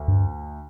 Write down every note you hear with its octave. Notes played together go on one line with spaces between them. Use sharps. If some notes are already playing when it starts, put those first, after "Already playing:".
Already playing: D2
G2